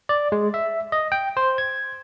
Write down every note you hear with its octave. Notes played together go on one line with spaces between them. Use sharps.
D5
G#3
E5
D#5
G5
C5
G#6